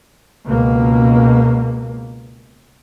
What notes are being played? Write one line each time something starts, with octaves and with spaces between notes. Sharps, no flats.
C#2 B2 A#3